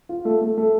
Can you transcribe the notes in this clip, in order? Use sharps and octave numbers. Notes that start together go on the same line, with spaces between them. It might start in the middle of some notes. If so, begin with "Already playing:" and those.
F4
A3
A3
A3